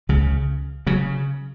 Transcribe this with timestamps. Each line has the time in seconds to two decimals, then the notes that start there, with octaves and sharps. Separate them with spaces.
0.09 C#2 C#3
0.87 C#3 F#3